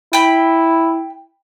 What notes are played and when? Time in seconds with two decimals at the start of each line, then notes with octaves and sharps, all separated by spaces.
0.13 E4 G5 B5